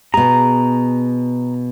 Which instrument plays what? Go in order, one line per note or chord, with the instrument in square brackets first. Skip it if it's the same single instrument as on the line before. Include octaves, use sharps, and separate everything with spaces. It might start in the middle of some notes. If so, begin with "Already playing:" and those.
[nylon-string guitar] B2 G#4 [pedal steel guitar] A#5